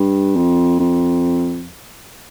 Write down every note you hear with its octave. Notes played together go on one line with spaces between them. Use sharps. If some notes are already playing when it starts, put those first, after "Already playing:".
Already playing: G2
F2
F2